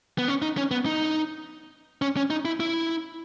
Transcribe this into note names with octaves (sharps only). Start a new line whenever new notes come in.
B3
C#4
D#4
C#4
B3
D#4
C#4
C#4
D#4
E4
E4